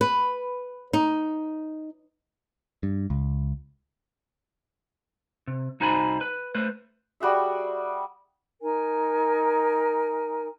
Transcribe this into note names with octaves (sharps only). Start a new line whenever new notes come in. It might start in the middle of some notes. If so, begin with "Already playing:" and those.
B4
D#4
G2
C#2
C3
C2 D#4 F#4 C5 G#5 B5
B4
A3 B4 C5
G3 F#4 G#4 E5
D#4 A#4 G#5